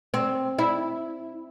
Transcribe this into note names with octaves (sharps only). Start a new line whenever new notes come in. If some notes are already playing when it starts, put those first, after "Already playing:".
C4
E4